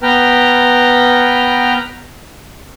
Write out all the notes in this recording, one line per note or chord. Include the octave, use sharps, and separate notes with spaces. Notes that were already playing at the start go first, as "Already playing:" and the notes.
B3 B4 G5 A#5 F6